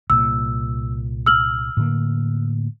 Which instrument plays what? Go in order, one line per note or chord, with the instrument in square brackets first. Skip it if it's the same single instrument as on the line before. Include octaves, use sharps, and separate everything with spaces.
[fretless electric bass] C2 A#2 [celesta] E6
[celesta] E6 F6 F#7
[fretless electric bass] A2 D3 A#3